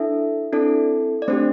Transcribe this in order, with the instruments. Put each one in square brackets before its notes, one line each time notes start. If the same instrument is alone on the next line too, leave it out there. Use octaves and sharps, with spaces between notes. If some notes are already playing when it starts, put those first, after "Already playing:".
Already playing: [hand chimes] D4 E4 A4 E5
C4 D4 E4 A4 D5
D5
A3 C4 D4 G4 C5